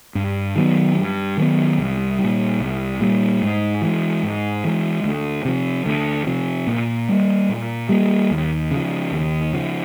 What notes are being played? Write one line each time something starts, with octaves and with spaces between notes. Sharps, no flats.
G2
D#3 F#3 B3
G2
D#3 F#3 B3
C2
G3
A#2
C2
A#2 G3
G#2
E3 G#3
G#2
E3 G#3
D2
C3 F3
D2
C3 F3
A#2
G3 A#3
A#2
G3 A#3
D#2
C#3 F3
D#2
C#3 F3